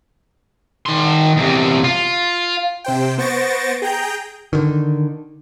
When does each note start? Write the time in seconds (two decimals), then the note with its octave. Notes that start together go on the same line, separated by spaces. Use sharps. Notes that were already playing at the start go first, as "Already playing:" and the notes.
0.86 D#3 C6
1.37 E2 C3
1.84 F4
2.84 C3 C5 G5
3.18 B3 C5 C#6 A6 A#6 D7
3.82 G#4 G5 A#5 G6
4.53 D3 D#3